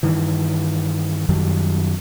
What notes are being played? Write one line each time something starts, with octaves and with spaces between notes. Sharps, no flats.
G2 D#3 E3
F#2 D#3 F#3 G3